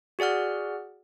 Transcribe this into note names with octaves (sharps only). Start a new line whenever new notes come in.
F#4 G#4 D5 F#5 F6